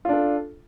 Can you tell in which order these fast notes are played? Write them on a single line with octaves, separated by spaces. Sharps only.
F4 D4 A4